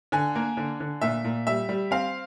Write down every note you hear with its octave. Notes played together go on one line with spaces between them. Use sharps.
D3 G#5
A#3
D3
D3
A#2 E5
A#2
G3 E5
G3
C4 F5